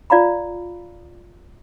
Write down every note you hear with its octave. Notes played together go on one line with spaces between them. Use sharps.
F4 D5 F5 A#5 B5